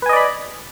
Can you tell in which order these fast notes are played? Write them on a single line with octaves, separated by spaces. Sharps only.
B4 G#5 D#5 D5 B5